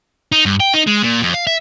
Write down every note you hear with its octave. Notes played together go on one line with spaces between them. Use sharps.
D#4
G2
G5
D#4
G#3
A#2
F2
F5
E5